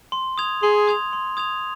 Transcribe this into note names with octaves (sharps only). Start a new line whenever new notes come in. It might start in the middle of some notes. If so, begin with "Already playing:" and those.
C6
D#6 G#6 F7
G#4 C6
D#6 G#6 F7
C6
D#6 G#6 F7